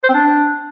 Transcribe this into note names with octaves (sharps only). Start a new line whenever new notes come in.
C5
C4
D4